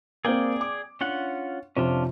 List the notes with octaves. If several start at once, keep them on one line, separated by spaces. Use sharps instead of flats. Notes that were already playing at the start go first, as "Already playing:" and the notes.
A#3 C4 G#4 D5 G5
D6
C#4 D4 F4 F#5
F2 C3 C#4 D4 F4